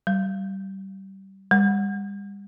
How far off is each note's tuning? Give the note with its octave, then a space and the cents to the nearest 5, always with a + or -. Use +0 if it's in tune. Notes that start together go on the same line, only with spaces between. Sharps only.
G3 -25
G3 +35